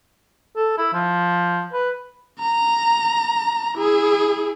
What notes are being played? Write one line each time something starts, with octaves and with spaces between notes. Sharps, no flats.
A4
E4
F3
B4
A#5
E4 G#4